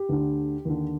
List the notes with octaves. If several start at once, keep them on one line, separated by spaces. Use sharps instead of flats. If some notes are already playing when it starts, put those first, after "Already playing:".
Already playing: G4
D2 D3
D#2 D3